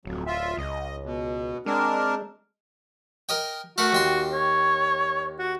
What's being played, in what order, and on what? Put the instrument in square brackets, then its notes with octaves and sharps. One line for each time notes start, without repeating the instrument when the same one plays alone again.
[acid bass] D1 [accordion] F2 F#3
[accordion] F4 E5
[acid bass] C#2 [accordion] D#5
[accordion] B2
[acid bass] G#3 [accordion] C4 D4 A#4
[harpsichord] A#4 D#5 G5
[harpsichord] A3 A#4 F#5 [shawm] F#4
[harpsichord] D#2 G5 C6
[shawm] C#5
F#4